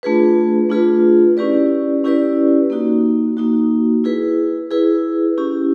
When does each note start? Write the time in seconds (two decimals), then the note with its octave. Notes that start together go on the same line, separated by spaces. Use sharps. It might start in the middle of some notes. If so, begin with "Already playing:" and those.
0.03 A3 D4 F4 G#4 B4
0.70 A3 D4 F4 G#4 B4
1.37 C#4 E4 G4 B4 D5
2.04 C#4 E4 G4 B4 D5
2.70 A#3 D#4 F#4
3.37 A#3 D#4 F#4
4.04 E4 G#4 B4
4.71 E4 G#4 B4
5.38 C#4 E4 G4